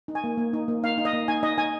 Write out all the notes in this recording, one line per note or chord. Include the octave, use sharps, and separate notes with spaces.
D#4
G#5
A#3
A#3
D#4
A#3
D#4 F5
D#4
D#5
A#3
D#4 G#5
D#4 D#5
D#4 G#5